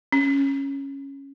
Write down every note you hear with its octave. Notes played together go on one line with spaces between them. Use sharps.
C#4